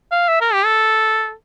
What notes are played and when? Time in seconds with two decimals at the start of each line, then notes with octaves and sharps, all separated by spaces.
0.11 F5
0.28 E5
0.41 A#4
0.53 G4
0.65 A4